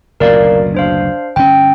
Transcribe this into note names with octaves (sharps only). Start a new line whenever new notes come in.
F#1 D2 B2 A#4 D5 F5
D4 C5 F5
G1 C#4 G5